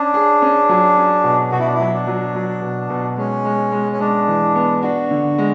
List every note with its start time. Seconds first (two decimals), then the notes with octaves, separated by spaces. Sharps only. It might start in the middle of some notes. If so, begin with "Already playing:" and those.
Already playing: C#4 D4
0.14 G#4
0.42 C#4
0.69 F#3
0.97 C#4
1.24 B2
1.52 B2 F#4
1.59 E4
1.67 D4
1.74 E4
1.80 F#3
1.93 D4
2.07 F#3
2.35 F#3
2.62 B2
2.90 B2
3.17 G#3 C#4
3.45 G#3
3.72 G#3
3.92 C#4
4.00 G#3 D4
4.28 E3
4.55 B3
4.82 D4 F#4
5.11 D3
5.38 G#3